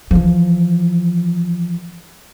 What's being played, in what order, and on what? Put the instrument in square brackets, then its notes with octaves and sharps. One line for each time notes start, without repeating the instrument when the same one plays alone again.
[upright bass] E3 F3